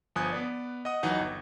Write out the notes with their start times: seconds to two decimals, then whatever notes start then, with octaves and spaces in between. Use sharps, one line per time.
0.16 G1 F3 G#5 D#6 F#6
0.33 B3 B4 D5
0.85 D#5 F#5 D#6
1.03 D#2 E3 F#3 D#4 F#5
1.20 G1